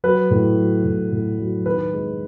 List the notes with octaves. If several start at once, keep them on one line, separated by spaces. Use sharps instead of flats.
F#3 B4
A2
F#3
A2
A2
F#3
D#3 B4
G#3